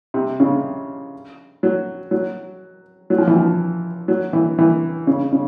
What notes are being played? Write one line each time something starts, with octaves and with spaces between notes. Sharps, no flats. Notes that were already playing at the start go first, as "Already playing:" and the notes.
C3
C#3
F#3
F#3
F#3
F3
E3
F3
F#3
E3
E3
C#3
C#3